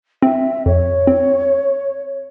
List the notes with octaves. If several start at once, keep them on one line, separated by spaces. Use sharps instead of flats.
C4 E5
F2 C#5
C4